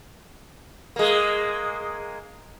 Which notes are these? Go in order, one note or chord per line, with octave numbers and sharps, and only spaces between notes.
G#3 A#3